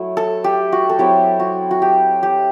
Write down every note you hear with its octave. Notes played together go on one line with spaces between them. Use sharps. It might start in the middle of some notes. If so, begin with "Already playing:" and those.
Already playing: F#3 A3 E4
A4
G4
F#4
A4
F#3 C4 E4 G4
F#4
F#4
G4
G4